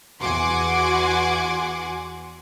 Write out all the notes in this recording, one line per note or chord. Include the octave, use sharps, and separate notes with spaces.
E2 F#4 F#5 G#5 C6 D6